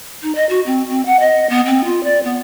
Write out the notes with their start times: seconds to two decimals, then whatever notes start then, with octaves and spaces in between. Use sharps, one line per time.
0.23 D#4
0.35 D#5
0.49 F#4
0.66 C4
0.90 C4
1.06 F#5
1.20 D#5
1.50 B3
1.66 C4
1.84 F4
2.04 D5
2.23 B3